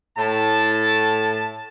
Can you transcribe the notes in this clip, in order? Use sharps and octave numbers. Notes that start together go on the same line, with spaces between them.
A2 A5